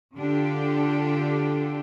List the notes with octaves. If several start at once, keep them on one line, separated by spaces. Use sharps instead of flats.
D3 D4 F4 G4 A4